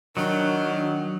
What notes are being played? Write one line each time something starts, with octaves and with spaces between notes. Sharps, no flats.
D#3 F#3 D4